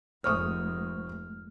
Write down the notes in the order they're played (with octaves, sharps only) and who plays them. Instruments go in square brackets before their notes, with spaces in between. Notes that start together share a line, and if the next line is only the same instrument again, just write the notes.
[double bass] F1 G#2 [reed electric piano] G#3 A3 [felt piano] C5 C#6 D#6 [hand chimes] F6